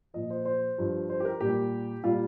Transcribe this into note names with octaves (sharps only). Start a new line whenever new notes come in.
A#2 F3 D#5
C5
C5
G2 F3
C5
G4
A#4
A#2 G3 G4
A#2 G3 F4